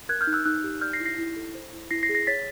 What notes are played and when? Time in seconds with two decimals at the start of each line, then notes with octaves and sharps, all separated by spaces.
0.09 A#4 F#6 G#6
0.21 F6 G6
0.27 D#4
0.33 E6 F#6
0.45 D#4 E6 F#6
0.64 G4
0.81 D5 F6 G6
0.93 A#6 C7
1.00 E4
1.05 A#6 C7
1.18 E4
1.36 A4
1.55 C5
1.73 E4
1.91 E4 A#6 C7
2.03 A#6 C7
2.09 G#4
2.14 A#6 C7
2.27 C#5 A6 B6